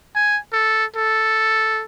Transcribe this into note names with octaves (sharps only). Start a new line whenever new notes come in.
G#5
A4
A4